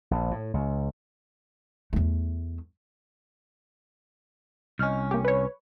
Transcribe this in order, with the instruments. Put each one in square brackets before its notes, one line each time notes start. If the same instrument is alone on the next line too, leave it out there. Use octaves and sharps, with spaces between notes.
[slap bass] A#1
A2
C#2
[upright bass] E2 A3
[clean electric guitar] C2 C#4 [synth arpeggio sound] D#5 F6
[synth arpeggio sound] A#3 G4
B4 C#5